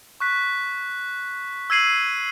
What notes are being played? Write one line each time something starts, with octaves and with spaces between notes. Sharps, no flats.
C#6 F#6 B6
E6 G#6 C7 D#7 F#7